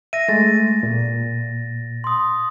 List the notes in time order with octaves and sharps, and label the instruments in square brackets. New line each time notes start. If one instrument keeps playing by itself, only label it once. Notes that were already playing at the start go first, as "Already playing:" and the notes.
[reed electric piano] E5 [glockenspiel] A#6 D#7
[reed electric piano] G#3 A3 [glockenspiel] A6 D#7
[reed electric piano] A#2
[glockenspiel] C6 D#6